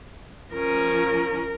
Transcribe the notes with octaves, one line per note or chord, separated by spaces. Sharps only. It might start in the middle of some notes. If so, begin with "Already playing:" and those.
F3 C#4 A#4